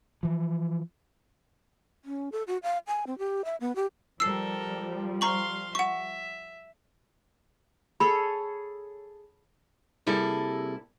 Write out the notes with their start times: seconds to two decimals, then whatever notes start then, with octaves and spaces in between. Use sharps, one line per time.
0.23 E3 F3
2.05 C#4
2.32 A4
2.47 F#4
2.63 F5
2.87 G#5
3.07 C4
3.18 G4
3.45 E5
3.60 B3
3.76 G4
4.20 F3 G3 A4 A#4 E6 C7
5.21 F5 A#5 C6 C#6 F#7
5.75 E5 F#5 C#6
8.00 G#4 A4 C#5 B5
10.06 C3 G3 A#3 E4 G#4 A4